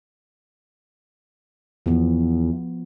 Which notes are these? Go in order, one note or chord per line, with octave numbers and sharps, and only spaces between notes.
E2 F3 B3